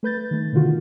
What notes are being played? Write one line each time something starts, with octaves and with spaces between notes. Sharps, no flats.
A3 B4 G6 A6
D#3 A3
B2 D3 D#3 F4 F#4